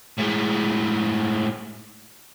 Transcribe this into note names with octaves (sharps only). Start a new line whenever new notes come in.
A2 G#3